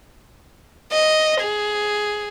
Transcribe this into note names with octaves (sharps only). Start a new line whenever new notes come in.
D#5
G#4